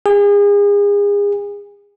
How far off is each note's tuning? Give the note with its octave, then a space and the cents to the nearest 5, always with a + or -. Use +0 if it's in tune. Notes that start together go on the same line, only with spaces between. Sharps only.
G#4 -35